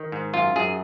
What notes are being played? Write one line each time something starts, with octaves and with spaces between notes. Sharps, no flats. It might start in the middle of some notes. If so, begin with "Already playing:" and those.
Already playing: D#3
G#2
F#2 F4
F#2 G#4